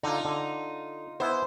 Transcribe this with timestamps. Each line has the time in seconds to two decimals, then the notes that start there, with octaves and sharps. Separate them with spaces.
0.03 D3 D#4 F4
0.25 D3
1.20 B3 E4 C5 G#5